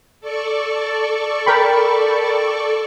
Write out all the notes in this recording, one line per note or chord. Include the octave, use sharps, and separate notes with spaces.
A4 D5 C#6
A#4 G5 B5